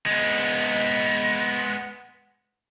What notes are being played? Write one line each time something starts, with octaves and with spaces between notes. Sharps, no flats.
G#3 B3